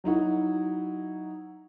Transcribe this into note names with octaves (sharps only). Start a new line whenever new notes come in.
F#3 D#4 E4 F#4